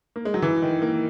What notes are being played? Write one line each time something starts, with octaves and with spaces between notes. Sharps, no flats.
A#3
G#3
F#3
E3
D#3
A#3